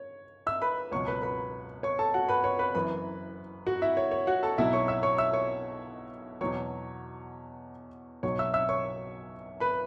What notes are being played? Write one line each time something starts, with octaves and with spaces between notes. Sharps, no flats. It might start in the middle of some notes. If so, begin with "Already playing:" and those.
Already playing: C#5
E5 E6
B4 B5
C#2 B2 F#3 C#5 C#6
B4 B5
B4 B5
C#5 C#6
A4 A5
F#4 F#5
B4 B5
C#5 C#6
B4 B5
F#1 F#2 E3 B4 B5
F#4 F#5
E4 E5
C#5
C#5
F#4 F#5
A4 A5
B1 B2 F#3 E4 E5
C#5 C#6
E5 E6
C#5 C#6
E5 E6
C#5 C#6
E2 B2 F#3 C#5 C#6
B1 B2 F#3 C#5 C#6
E5 E6
E5 E6
C#5 C#6
B4 B5